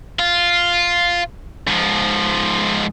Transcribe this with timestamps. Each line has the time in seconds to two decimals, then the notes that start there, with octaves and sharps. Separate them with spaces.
0.19 F4
1.67 G#2 F3